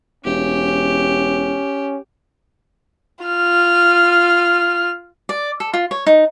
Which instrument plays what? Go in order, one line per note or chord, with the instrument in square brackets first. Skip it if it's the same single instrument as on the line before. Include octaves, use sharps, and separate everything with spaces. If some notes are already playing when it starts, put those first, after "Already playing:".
[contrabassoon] E1 [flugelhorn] C#4 [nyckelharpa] G4
[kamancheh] F4 F6
[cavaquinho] D5
A4
F4
C#5
D#4